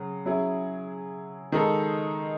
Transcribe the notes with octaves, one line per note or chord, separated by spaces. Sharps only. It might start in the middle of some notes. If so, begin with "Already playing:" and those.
Already playing: C#3 F#3
F#3 C#4 E4 G#4
D#3 G#3 D#4 A4